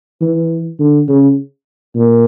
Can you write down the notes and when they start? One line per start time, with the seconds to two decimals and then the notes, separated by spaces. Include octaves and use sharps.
0.21 E3
0.79 D3
1.08 C#3
1.95 A#2